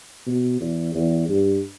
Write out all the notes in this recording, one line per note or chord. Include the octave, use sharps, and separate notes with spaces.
B2
E2
E2
G2